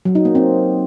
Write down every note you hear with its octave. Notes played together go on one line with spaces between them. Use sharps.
F#3
D#4
A#3
C4